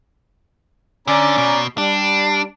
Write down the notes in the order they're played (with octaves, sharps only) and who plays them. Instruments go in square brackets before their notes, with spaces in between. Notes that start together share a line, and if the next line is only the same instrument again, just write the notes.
[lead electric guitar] D3 [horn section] C#4 D5 A#5
[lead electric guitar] B2
[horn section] G3 [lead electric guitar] D4